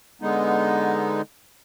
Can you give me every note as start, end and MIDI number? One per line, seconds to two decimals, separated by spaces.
0.22 1.21 50
0.22 1.21 56
0.22 1.21 59
0.22 1.21 63